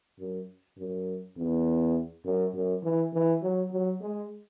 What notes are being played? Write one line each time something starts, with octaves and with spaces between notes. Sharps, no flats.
F#2
F#2
E2
F#2
F#2
E3
E3
F#3
F#3
G#3